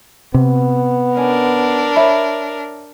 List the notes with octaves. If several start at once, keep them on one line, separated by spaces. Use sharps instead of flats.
C3 B3
C#4 D4 A#4
C#5 E5 B5